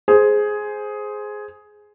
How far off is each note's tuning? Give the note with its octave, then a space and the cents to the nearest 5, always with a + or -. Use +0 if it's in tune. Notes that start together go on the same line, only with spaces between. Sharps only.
G#4 +10 C5 +0